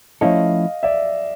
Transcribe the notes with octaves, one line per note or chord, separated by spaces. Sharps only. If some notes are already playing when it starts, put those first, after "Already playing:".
F3 A3 C#4 E4 A4 D#5 F5
D5 E5